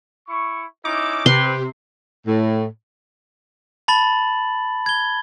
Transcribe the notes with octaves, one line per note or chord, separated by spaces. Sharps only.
E4 C#6
C#4 D#4 E4 D6
C3 G4 B4 C6
A2
A5 B5 A6 F#7
G#6 G7